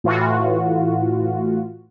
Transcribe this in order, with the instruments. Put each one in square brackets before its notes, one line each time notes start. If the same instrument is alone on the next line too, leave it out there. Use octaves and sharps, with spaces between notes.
[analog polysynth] A2 E3 F4 F#4